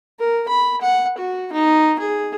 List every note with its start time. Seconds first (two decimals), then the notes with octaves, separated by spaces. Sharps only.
0.20 A#4
0.49 B5
0.81 F#5
1.18 F#4
1.53 D#4
1.99 G#4